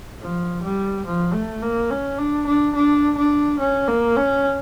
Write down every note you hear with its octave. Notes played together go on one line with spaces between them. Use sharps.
F3
G3
F3
A3
A#3
C#4
D4
D4
D4
D4
C#4
A#3
C#4